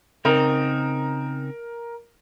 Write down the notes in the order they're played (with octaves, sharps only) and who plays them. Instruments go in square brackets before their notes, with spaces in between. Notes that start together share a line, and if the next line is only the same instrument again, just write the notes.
[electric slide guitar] C#3 C4 D#4 [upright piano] A#4